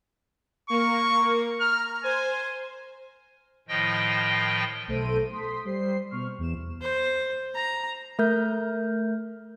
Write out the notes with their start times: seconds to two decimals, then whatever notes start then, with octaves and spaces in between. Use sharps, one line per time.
0.70 A#3 A#4 C#6
1.60 A#5 F6
2.04 C5 G#5
3.68 A2 D#3 F3 D#5 G5
4.87 B1 A3 A4 C5 D7 D#7
5.32 C6 D#6 B6
5.65 G3 C5 C7
6.11 B2 C#6 F6
6.38 E2 E7
6.81 C5
7.55 A#5
8.19 A3 A#4 G6